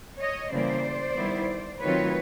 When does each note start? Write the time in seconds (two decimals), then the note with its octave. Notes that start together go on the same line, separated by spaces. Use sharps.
0.19 C#5 D#5
0.51 C#3 E3 G3 A#3 C5 D5
1.16 D#3 G3 B3 E4
1.82 D#3 F#3 A3 C4 F4 B4 C#5